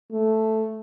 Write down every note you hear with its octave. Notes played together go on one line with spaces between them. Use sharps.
A3